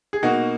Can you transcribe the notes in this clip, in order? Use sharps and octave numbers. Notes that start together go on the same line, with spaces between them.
G#4
B2 A#3 D#4 F#4